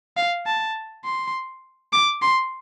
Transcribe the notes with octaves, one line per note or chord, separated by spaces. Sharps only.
F5
A5
C6
D6
C6